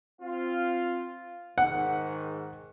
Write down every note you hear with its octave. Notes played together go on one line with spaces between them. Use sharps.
C4 F4 F5
G#2 D#3 F#5